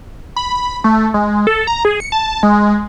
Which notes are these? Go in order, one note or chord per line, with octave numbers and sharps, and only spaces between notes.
B5
A3
G#3
A4
A#5
G#4
C#7
A5
G#3